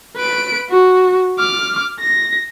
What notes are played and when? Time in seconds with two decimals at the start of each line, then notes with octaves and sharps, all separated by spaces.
0.16 B4 D7
0.70 F#4
1.39 D6 F6
2.00 A#6